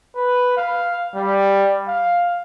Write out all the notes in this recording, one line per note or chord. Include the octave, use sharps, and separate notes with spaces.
B4
F5
G3
F5